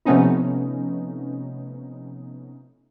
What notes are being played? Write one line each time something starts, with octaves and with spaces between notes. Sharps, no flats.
C3 F3 A3 B3 C#4 D#4